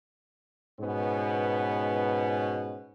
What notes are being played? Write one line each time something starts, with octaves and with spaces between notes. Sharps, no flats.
G#2 B2 B3 C#4